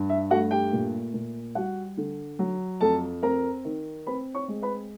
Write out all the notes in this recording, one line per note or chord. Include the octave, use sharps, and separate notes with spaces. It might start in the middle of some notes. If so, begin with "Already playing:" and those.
Already playing: G2
E5
A3 F#4 F#5
G4 G5
A#2
A#2
G3 F#4 F#5
D3
F#3
F2 A4 A5
C4 A#4 A#5
D#3
C4 B4 B5
C#5 C#6
G#3
B4 B5